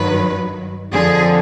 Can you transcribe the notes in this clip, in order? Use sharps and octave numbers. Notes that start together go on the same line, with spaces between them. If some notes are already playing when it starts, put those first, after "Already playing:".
Already playing: G2 D#3 F#3 B4
F2 D3 F3 G#4